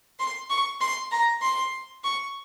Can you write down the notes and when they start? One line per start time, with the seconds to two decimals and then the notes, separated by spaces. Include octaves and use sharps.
0.20 C6
0.50 C#6
0.81 C6
1.11 A#5
1.42 C6
2.04 C#6